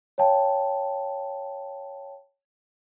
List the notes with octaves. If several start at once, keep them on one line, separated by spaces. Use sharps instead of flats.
C#5 F5 G5 A5